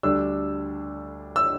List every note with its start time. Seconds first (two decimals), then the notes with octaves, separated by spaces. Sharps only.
0.03 D2 D3 G3 D4 E6
1.36 E6